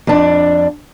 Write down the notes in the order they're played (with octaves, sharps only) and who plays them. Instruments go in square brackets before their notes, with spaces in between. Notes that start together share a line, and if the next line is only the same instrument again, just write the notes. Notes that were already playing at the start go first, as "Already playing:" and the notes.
[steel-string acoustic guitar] F2 D4